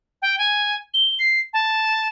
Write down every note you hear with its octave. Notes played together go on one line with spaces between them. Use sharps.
G5
G#5
G7
C7
A5